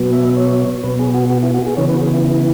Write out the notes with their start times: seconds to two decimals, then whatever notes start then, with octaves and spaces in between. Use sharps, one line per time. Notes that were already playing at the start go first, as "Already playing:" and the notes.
Already playing: B2 F#3 B3
0.13 E5
0.37 C#5
0.83 B2 B3 B4
0.99 G#4
1.14 F#4
1.30 F#4
1.43 E4
1.54 F#4
1.66 G#4
1.77 C#3 E3 B3 C#5
1.89 B4
1.96 F#4
2.00 G#4
2.13 E4
2.24 E4